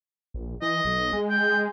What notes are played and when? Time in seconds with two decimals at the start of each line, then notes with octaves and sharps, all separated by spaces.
0.34 A#1
0.62 E3 D#5
0.84 B1
1.13 G#3
1.29 G5